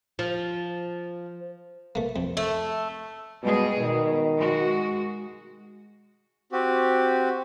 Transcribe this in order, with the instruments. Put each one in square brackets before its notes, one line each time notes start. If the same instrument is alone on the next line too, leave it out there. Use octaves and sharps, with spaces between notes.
[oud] F3
[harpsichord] A3 A#3
F2
[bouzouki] A3
[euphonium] B2 [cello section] G3 G#3 G#4
[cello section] B2 [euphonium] D#3
[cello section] G#3 F#4
[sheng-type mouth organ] C4 F#4 G4